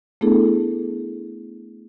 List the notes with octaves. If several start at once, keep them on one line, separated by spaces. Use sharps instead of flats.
A3 B3 D4 E4 G#4 A4